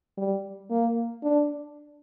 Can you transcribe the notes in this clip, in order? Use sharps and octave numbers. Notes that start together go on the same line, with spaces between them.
G3
A#3
D4